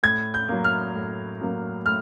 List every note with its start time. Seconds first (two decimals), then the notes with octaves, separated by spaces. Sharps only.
0.03 A2 G#6
0.34 G6
0.49 F#3 A#3
0.64 F6
0.95 A2
1.41 F#3 A#3
1.86 A2 F6